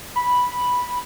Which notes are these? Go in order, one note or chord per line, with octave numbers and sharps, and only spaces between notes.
B5